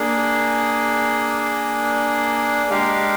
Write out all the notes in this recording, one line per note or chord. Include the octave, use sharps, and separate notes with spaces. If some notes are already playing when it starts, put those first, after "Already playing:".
Already playing: A#3 D4 G#4
G#3 D4 G4 A#4 F5